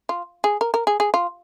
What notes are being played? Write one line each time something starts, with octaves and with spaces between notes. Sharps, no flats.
F4
G#4
A#4
A#4
G#4
G#4
F4